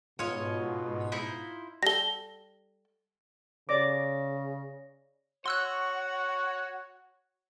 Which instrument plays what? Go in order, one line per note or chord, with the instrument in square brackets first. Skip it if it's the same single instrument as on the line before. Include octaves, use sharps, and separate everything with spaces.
[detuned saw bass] G#2 [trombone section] B2 [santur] F4 [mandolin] C#5 D#5
[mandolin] D#4 E4 C5
[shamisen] G3 A4 [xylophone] A#6 G7
[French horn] C#3 [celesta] C#5 A#6 [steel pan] D5 D6
[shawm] F#4 [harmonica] C#5 [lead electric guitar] F#5 [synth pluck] C6 E6 F#6